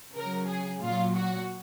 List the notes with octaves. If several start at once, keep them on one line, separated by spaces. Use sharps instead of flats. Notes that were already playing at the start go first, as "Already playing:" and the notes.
C#3 F#3 A#4
G#4
A#2 F#3 F4
F#4